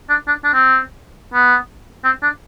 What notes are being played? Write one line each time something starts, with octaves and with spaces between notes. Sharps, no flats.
D4
D4
D4
C4
B3
C4
D4